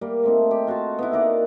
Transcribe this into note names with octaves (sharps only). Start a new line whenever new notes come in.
G3 A#3
A3 C4 D#4
G4
F4 F#4 F5 A5
B3 D#4 E4
A#3 D#4 D5 F#5